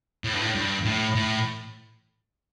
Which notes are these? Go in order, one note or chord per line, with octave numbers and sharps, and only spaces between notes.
A2
G2
A2
G2
A2
A2